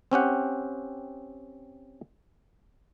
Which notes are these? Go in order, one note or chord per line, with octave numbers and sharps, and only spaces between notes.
C4 C#4 G4 F#5